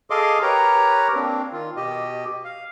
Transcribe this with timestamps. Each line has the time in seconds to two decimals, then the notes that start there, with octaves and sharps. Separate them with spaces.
0.10 G#4 A4 D#5 F5 C6 D6
0.42 G4 A#4 B4 C#5 A#5
1.15 A#3 C4 D4
1.52 D#3 F4
1.76 B2 G4 D#5
2.44 F5